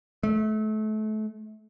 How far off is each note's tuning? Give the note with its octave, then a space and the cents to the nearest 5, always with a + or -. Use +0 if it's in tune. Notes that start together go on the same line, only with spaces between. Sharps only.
A3 -30